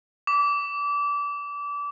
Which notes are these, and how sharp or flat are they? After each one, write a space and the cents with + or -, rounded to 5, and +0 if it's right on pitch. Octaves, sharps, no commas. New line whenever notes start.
D6 -25